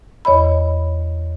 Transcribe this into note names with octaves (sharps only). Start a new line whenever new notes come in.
E2 C#5 D#5 B5